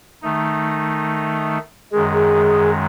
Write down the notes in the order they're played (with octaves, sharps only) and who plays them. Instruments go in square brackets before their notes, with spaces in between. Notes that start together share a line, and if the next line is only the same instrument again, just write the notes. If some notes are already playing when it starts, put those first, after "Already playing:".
[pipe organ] D#3 A3 D#4
[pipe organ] F#2 D#3 G#3 [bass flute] G#4
[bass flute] G#4